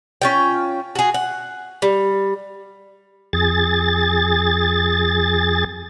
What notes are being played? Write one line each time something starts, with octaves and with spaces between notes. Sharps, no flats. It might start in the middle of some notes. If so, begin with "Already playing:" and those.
C#4 F4 G5
F#4 G#4
F#5
G3
F2 G#4 A6